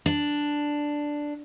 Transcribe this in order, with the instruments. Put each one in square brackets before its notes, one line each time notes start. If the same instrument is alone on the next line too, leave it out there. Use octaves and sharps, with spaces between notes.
[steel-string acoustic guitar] D4